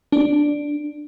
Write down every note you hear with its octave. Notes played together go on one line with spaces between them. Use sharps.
D4